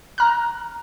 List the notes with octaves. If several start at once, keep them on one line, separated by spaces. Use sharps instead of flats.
A#5 F6 F#6